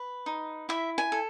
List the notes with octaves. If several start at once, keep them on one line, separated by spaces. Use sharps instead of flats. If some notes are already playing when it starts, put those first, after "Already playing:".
Already playing: B4
D#4
E4 E5
G#5
A4